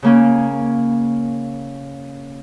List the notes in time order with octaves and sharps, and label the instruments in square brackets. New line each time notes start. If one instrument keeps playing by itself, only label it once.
[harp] C#3 A#3 C#4